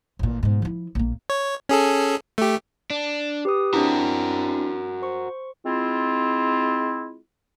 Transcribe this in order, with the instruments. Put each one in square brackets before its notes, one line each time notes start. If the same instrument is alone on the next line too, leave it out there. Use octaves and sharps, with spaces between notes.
[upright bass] A1 A#2
G#2 B2
F3 E4
A#1 A#3
[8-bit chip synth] C#5
C#4 G#4 A4
A3 G4
[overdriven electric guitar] D4
[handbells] G4 B4 D#6
[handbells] C4 D4 E4 [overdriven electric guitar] F#4 A#4
[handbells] C5 C#6
[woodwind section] G#3 C4 E4 F4